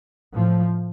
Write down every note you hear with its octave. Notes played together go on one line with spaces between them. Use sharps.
A2 F3